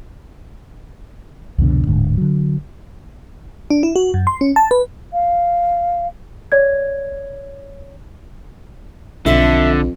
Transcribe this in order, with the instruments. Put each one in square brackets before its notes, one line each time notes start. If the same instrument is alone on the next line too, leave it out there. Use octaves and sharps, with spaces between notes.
[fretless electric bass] C2 F2 B2 D3
D1 G#2 D3
D3 F#3
[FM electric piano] D4
E4
F#4
F#2
C6
C#4
A5
B4
[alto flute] F5
[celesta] C#5 D5 G#6
[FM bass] B1 [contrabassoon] F2 [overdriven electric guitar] D3 [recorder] E5